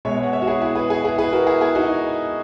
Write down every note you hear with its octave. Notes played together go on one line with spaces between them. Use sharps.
B2 G#3 C#5 E5
F#5
C#5 E5
F#4
E4 G#4
E4 G#4
G#4 B4
G#4 B4
E4 G#4
G#4 B4
F#4 A#4
E4 G#4
E4 G#4
D#4 F#4